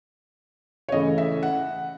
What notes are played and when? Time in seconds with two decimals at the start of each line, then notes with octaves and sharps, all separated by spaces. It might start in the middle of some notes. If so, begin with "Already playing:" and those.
0.89 C#5
0.92 C#3 E3 A3 D#5
1.18 E5
1.43 F#5